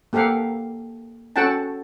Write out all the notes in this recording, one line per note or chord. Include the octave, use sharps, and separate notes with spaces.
A#3 G4 A4 F5 F#5
C#4 F#4 A4 F#5 G5 A5